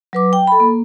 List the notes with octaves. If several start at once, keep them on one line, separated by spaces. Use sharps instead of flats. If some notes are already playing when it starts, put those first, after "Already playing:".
F#3 B4 D6
G5
A4 B5
A#3